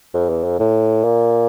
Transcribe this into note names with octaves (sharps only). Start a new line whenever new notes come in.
F2
E2
F2
A2
A#2